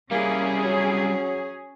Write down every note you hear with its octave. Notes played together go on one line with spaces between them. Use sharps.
G3 A#3 C#4 E4 G#4
F#3